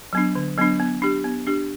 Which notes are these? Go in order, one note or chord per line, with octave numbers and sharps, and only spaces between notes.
F#3 B3 D4
D3
F#3 B3 D4
B3
D4 G4
B3
D4 G4